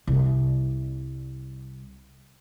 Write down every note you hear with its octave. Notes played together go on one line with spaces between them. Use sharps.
C2 G3